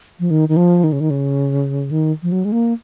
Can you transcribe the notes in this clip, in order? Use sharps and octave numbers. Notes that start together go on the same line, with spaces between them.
F3
D#3
D#3
F3
D#3
C#3
D#3
C#3
D#3
F3
F#3
G#3
A#3